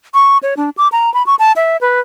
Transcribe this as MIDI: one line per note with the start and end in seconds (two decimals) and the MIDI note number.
0.14 0.38 85
0.43 0.54 73
0.57 0.70 62
0.78 0.88 86
0.92 1.12 82
1.14 1.25 83
1.26 1.35 85
1.39 1.52 81
1.56 1.77 76
1.81 2.00 71